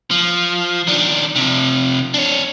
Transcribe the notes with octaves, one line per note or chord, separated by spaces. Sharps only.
F3
D#3 D4
C3 F3
D4 C#5